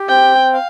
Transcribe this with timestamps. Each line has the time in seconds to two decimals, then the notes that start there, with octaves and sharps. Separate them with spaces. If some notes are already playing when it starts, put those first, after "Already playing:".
Already playing: G4
0.09 C4 G5
0.53 F5